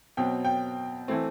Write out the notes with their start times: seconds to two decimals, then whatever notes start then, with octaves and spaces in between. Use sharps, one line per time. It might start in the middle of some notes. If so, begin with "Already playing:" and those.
0.17 B2 F#3 C4 G5
0.45 G5
1.08 E3 A3 C4